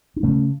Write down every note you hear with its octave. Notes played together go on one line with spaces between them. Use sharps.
D4
C#3 A3 C#4